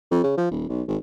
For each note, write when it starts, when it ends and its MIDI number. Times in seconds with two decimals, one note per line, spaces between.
0.11 0.22 41
0.24 0.35 49
0.37 0.49 53
0.51 0.66 27
0.69 0.82 35
0.88 0.97 32